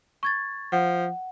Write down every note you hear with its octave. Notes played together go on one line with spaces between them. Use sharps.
C#6 G#6 A6
F3 F#5